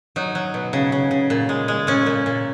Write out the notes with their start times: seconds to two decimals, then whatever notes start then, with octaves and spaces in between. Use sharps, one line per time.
0.16 F#3 D#4
0.35 F#3
0.54 B2
0.73 C#3
0.92 C#3
1.11 C#3
1.30 A#2
1.49 G#3
1.68 G#3
1.87 A#2 C#4
2.06 A#2
2.26 A#2